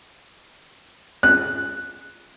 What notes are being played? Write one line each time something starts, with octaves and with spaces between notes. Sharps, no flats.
F#6